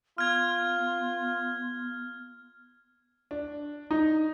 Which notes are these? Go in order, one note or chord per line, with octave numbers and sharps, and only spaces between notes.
B3 F4 F6 G#6
D4
D#4